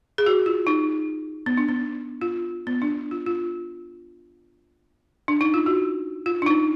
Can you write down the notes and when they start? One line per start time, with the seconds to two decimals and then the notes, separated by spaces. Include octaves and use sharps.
0.18 G#4
0.26 F#4
0.46 F4
0.67 D#4
1.46 B3
1.57 D4
1.68 B3
2.21 F4
2.67 B3
2.82 D4
3.11 F4
3.26 F4
5.28 D4
5.41 D#4
5.54 F4
5.66 F#4
6.26 F4
6.42 D4
6.46 D#4